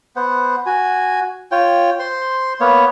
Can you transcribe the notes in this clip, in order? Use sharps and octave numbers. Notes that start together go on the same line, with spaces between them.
B3 C5 F#5
F#4 G#5
F4 C#5 G5
C5 C6
A#3 B3 C#5